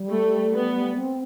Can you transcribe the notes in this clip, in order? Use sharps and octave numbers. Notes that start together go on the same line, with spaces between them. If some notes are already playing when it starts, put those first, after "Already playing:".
Already playing: G3
A3
B3
C4